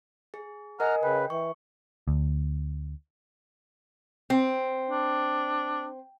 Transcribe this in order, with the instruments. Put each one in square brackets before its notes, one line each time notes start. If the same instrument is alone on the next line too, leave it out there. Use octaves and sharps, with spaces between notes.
[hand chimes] G#4
[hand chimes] A#4 D#5 G#5 [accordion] F#5 A#5 F6
[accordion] C#3 B4 [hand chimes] G5
[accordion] E3 [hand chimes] C#6
[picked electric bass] D2
[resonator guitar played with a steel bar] C4
[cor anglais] D4